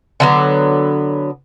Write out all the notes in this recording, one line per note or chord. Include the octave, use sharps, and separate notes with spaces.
D3 F#3 B3